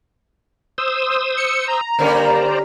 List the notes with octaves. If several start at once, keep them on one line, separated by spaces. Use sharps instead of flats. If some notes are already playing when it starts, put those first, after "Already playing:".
C5 D#6 E6
C#7
A#5
D3 G3 A#3 C#4 C5 D5